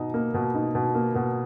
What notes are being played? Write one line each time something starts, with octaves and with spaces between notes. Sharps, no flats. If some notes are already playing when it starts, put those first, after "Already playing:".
Already playing: B2 D#4
A#3
B2
D#4
B2
A#3
B2